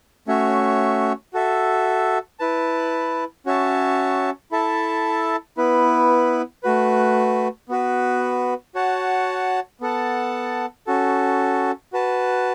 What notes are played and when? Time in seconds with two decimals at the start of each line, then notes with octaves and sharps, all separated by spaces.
0.27 A3 C#4 F#4 C#5 E5
1.34 F#4 A4 E5
2.39 E4 B4 A5
3.46 C#4 F#4 C#5 E5 A5
4.51 E4 A4 E5 A5
5.57 B3 E4 B4
6.63 A3 F#4 B4
7.69 B3 F#4 B4
8.75 F#4 C#5 F#5 A5
9.81 B3 A4 F#5 A5
10.87 C#4 F#4 A4
11.93 F#4 B4 A5